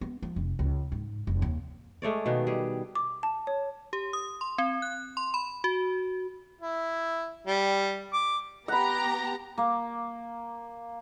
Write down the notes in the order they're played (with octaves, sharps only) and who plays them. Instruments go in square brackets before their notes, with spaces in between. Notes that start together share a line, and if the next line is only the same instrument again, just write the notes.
[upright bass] B3
F3
F1
C#2
G#2
F1
D#2
[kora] G#3 A3 C#5 D5
B2 D#3 B3 F5
G3 G#4
[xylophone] D6
A5
C#5
[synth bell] G4
D#6
C6
C4
F#6
C6
B5
F#4
[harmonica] E4
G3
D6
[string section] B3 G4 A#5 [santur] F#5 B5
[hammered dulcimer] A#3